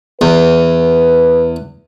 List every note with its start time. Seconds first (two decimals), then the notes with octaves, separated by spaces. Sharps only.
0.21 E2 B4